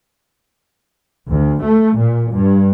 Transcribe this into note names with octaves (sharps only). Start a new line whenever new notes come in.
D2
A3
A#2
G2